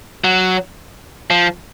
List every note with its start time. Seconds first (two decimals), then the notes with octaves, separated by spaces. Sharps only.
0.24 F#3
1.30 F3